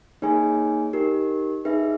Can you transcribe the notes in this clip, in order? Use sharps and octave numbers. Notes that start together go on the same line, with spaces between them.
A#3 D#4 G#4 C#5 G#5
D#4 G4 A#4
D#4 G#4 B4 E5